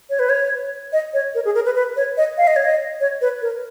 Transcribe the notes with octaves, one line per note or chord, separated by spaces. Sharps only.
C#5
B4
C#5
D#5
C#5
A#4
G#4
A#4
B4
B4
C#5
D#5
F5
D#5
C#5
D#5
C#5
B4
A#4